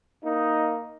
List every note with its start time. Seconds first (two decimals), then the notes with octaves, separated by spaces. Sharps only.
0.23 A#3 D#4